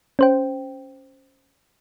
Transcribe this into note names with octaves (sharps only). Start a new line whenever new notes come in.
C#4 C5 G5